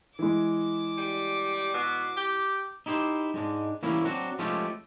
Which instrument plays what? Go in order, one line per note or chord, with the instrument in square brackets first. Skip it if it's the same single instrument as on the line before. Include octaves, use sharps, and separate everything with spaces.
[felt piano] E3 G#3 [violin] D6
[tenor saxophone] G3
B2
G4
[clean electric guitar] D#4 E4 G4 B4 C5
G#2 G#3 D4
E3 G3 A#3 C#4 E4
F#3 C4 D4 F#4
F3 G#3 A3 C#4 F4 G4